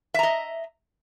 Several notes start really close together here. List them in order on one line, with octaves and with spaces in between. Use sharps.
E5 A#5 D#5